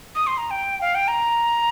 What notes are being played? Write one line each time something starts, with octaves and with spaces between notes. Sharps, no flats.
D#6
C6
A#5
G5
F5
G5
A#5